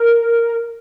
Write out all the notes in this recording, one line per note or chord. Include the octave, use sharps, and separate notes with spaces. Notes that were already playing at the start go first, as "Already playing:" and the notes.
Already playing: A#4